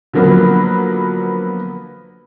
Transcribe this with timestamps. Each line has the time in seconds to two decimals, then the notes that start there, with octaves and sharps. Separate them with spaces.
0.13 D3 F3 F#3 A#3 B3